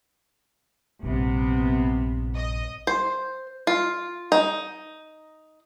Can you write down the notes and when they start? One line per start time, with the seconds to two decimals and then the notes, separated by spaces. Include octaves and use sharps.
1.03 A#1 G2 C3 B3
2.36 D#5
2.87 C5
3.67 F4
4.32 D#4